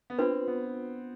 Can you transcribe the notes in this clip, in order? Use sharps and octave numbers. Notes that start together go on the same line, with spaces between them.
B3
C4 D4 F4 B4
B3